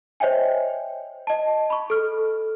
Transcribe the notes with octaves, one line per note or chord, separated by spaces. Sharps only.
C5 C#5 D#5 E5 G5 G#5
D#5 A5
B5 C#6
A4 F6